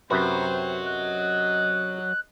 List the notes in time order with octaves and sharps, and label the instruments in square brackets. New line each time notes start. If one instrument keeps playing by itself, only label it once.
[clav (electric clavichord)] F#2 C3 B4 [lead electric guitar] F#3 F#4 [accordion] C4 [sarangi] C5
[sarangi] D#5 [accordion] F#6